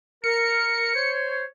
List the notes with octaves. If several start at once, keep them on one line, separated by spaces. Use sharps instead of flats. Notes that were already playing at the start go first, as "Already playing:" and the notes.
A#4 C#7
C5 C#5